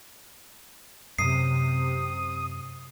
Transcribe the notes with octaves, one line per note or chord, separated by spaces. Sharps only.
F#2 C3 D#6 C7